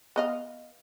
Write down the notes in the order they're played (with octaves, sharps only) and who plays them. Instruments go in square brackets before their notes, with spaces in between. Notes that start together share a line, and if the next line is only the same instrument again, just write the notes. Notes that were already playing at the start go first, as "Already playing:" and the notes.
[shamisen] B3 D#5 F5